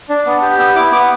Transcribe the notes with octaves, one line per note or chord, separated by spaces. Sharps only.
D4
B3
G4
B3 E6
E4 D6
B3 D6